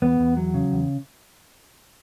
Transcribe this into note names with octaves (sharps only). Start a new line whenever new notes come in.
E2 B3
E2
F#3
C#3
E2